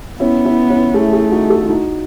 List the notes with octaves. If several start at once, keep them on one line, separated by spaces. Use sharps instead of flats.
B3 C#4 E4
C#4 E4
C#4 E4
A3 E4 G#4
E4 G#4
D#4 F#4
F#4 A4
E4
D#4 F#4